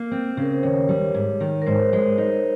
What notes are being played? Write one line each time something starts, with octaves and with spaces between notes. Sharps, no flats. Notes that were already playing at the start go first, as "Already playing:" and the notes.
Already playing: A#3
C4
C#3 A#4
C5
D#2 C#5
G3
G#2
D#3
A#4
G#2 C5
G#3
D#4